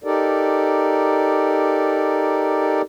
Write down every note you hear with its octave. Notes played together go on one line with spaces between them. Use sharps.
D#4 G4 A4 A#4 D5